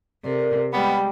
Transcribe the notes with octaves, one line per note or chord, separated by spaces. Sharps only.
C3 A4 A#4 D5
G3 G#3 B3 D6